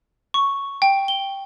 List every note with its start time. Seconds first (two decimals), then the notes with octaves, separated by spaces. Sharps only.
0.34 C#6
0.82 G5
1.08 G7